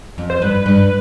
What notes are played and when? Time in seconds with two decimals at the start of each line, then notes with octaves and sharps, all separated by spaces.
0.18 F2
0.30 C5
0.42 G2 B4
0.66 G2